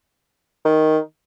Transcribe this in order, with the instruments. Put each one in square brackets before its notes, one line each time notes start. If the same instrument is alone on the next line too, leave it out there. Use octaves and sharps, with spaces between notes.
[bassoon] D#3